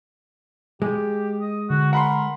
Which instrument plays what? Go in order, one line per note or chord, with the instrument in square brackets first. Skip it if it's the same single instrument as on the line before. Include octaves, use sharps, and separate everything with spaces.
[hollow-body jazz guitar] G#3 [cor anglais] G4
[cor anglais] D#5
[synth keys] D3 [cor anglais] F#4
[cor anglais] A#4 [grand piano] F#5 B5 C6